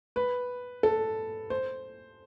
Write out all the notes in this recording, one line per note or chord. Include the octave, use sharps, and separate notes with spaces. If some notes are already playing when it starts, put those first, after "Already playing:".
B4
A4
C5